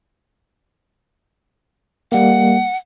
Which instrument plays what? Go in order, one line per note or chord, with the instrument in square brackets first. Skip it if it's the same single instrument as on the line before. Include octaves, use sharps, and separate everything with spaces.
[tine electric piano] G3 A#3 [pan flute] F#5